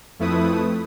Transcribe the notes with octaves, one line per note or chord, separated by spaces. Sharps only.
F2 A3 E4 B4 D#6